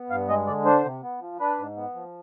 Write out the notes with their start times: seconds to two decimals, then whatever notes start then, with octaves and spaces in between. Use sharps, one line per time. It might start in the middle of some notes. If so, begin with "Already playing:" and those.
Already playing: B3
0.10 G2 F5
0.29 G#3 D#5
0.47 D3 D5
0.65 D4 C5
0.85 C3
1.03 B3
1.21 F3
1.40 D4 B4
1.59 G#2
1.77 B3
1.95 F3